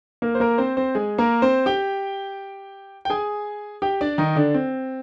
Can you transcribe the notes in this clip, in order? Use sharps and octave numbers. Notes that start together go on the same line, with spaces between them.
A#3 A#4
C5
A#3 A#4
C4 C5
C4 C5
G#3 G#4
A#3 A#4
C4 C5
G4 G5
G5
G#4 G#5
G4 G5
D4 D5
D#3 D#4
D3 D4
C4